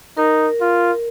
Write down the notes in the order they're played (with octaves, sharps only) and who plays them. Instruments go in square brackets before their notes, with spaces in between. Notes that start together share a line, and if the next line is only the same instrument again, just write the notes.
[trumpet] D#4 [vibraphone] A#4
[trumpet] F4